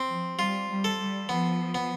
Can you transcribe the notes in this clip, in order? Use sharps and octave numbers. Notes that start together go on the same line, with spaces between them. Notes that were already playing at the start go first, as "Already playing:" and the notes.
Already playing: C4
F3
G3 F4
G3
A4
G3
F3 B3
B3